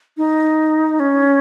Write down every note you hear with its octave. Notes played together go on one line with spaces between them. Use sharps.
D#4
C#4